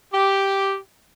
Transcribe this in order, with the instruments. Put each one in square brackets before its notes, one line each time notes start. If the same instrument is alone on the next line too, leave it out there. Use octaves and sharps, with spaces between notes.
[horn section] G4